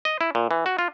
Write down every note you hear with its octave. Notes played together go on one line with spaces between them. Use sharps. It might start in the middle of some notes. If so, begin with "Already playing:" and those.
D#5
E4
A#2
E3
F#4
F4